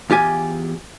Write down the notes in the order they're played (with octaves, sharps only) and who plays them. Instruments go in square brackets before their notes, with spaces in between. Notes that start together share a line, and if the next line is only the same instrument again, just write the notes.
[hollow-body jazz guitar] E2 F4 G4 G#5